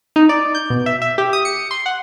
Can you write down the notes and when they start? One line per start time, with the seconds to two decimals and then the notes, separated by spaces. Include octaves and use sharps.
0.16 D#4
0.29 D5
0.55 G6
0.70 B2
0.86 E5
1.02 E5
1.18 G4
1.33 D#6
1.45 C#7
1.71 C6
1.86 F#5